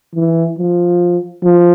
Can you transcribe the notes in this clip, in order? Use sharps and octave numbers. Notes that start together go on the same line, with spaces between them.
E3
F3
F3